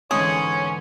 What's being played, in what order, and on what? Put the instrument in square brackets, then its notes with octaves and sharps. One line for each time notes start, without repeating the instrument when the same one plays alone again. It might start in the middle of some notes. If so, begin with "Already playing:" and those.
[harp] G#2 D3 E3 [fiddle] C#4 [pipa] G#4 [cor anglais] C#5